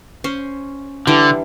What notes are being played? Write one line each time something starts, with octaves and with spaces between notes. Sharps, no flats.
C#4 C5
D3 E3 G3 D4